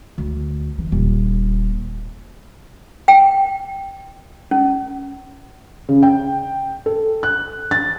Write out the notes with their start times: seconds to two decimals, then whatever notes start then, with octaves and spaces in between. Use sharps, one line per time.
0.18 D2
0.78 E3
0.92 D#1
3.08 G5
4.51 C#4
5.89 C#3
6.03 G5
6.86 A4
7.23 F#6
7.71 A6